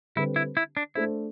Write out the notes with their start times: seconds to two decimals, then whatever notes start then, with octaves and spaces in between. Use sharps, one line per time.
0.16 D3 G3 C4 E4 G4 B4
0.36 E4
0.57 E4
0.77 D4
0.95 A3 D4 E4 A4 C5